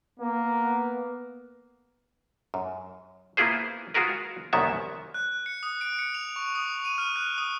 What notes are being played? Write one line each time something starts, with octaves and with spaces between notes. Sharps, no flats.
A#3 B3
F#2
A#3 B3 E4 F4 G#4 C5
G#3 F4 F#4 G#4 A#4 B4
C2 F#2 D#3 A#3 B3 E5
F#6
C#7
D#6
D7
C#7
F7
C#6
D#6
D#7
F6
F#6
D#6